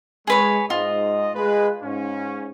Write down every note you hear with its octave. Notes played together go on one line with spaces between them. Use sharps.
G#3 G#4 B4 C#5
G#2 F4 D#5
G#3 B4
G#2 C#4